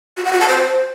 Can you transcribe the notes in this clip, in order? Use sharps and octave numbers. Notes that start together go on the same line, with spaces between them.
F#4
F#5
F#4
A5
C5